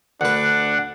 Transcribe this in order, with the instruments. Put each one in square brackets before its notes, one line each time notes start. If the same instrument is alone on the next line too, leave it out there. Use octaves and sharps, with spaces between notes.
[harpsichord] D2 B4 [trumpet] D4 [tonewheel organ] F#5